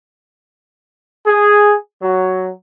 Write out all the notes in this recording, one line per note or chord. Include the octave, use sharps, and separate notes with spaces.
G#4
F#3